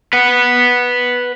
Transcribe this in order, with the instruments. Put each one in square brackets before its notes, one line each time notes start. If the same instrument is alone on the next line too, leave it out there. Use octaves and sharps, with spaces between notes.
[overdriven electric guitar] B4 F#5